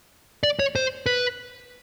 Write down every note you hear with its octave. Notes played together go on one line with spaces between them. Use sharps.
D5
C#5
C5
B4